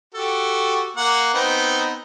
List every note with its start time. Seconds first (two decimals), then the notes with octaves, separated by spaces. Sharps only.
0.15 F#4 G4 A4
0.97 A#3 F#5
1.34 B3 C4 D#4